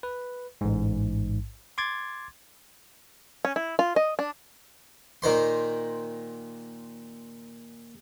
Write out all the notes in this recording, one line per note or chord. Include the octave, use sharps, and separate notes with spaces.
B4
A1 G#2
C6 D6 G#6 A6
C#4
E4
F4
D#5
D4
A#2 D#3 C5 C6